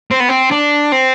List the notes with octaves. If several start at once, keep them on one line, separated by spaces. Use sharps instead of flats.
C4
B3
C4
D4
C4